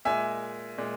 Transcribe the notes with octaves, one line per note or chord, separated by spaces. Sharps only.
A#2 G#3 E5 G#5
A#2 G#3